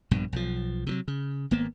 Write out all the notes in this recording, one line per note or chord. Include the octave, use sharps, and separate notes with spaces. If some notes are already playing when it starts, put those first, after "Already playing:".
A#1 G2 B2
B1 F3
C3 E3 F#3
C#3
G#1 A#3 B3